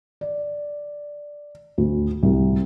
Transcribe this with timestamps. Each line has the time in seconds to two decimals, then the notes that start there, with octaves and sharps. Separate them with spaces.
0.21 D5
1.78 D2
2.23 C2